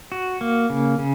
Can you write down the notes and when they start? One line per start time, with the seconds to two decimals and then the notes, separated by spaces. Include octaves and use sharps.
0.12 F#4
0.41 A#3
0.70 C#3
0.99 C#3